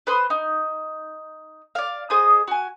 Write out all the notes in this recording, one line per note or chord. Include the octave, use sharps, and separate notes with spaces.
B4 C5 C6 D#6
D#4
D5 F5
G#4 C5 D#5 D#6
F#4 G#5